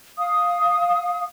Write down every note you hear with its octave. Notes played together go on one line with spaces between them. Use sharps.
F5 D#6